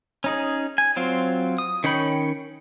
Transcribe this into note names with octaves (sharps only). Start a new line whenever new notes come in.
C#4 D#4 G#4
G#5
F#3 C4 F4
D#6
D#3 C#4 C#5 G5 B5